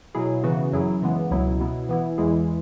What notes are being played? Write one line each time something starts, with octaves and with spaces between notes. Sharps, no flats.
B2 F#3 E4 G#4
C#3 E3 B3 F#4
F#2 F#3 E4 G#4
C#3 E3 G#3 B3
C#2 B2 F#3 B3 E4
B2 B3 E4
E3 B3 E4
E2 E3 G#3 E4 G#4